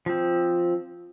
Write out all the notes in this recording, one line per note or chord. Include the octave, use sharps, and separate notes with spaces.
F3 C4